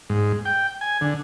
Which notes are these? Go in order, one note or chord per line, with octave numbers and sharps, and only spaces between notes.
G#2
G5
G#5
D3